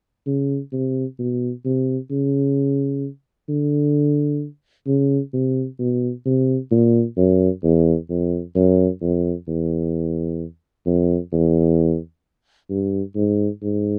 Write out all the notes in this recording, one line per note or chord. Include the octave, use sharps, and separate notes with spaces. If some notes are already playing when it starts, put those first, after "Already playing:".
C#3
C3
B2
C3
C#3
D3
C#3
C3
B2
C3
A#2
F#2
E2
F2
F#2
F2
E2
F2
E2
G2
G#2
G#2